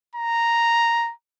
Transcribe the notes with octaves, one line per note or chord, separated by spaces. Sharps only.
A#5